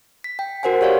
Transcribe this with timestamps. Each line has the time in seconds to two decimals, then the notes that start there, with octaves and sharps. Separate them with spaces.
0.24 B6
0.39 G5
0.63 F#4 A#4 C5 F#5 G#5
0.81 F#4 G4 C#5 D5 F5 G#5